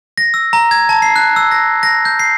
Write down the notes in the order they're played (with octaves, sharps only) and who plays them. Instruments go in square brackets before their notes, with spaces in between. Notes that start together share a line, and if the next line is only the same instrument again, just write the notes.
[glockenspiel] A#6
E6
A#5
G#6
A5
C7
F#6
E6
A#6
A#6
G6
C7